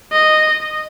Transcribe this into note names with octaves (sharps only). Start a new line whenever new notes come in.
D#5